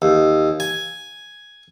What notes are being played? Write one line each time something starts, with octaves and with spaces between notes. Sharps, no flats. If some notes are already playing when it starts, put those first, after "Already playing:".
D#2
G#5